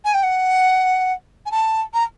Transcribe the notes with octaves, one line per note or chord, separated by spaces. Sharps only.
G#5
G5
F#5
G#5
A5
A#5